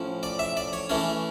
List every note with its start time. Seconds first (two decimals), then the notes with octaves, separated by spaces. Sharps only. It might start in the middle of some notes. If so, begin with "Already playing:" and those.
Already playing: A2 F3 C#4
0.23 D5
0.39 E5
0.57 D5
0.73 C#5
0.89 E3 A3 C#4 C#5